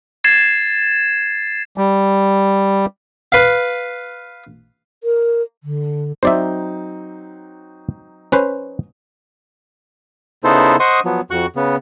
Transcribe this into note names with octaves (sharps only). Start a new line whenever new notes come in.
G#6 A6 C7 E7
G3
B4 F5
A#4
D3
F#3 C4 D#4 C5 D5 E5
C#4 B4 C5
C#3 B3 D#4 E4 A4 C5
C5 D#5 F#5 C6 C#6 D#6
F3 F#3 B3
F2 F#4 F#5 C#6 F#6
C#3 B3